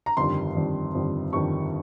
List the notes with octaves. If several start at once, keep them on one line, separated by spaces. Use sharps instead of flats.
A#5
G1 F2 D#3 G3 C6
G1 F2 D#3 G3
G1 F2 D#3 G3
G1 F2 D#3 G3 C#6